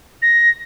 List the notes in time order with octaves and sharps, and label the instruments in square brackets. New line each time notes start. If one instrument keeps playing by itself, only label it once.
[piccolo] A#6